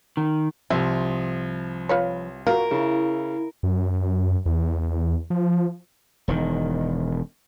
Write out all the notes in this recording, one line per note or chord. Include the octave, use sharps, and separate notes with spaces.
D#3
C2 F3 E5
F4 B4 C#5
F4 F#4 A#4
C#3 E4
F#2
E2
F3
E1 D#3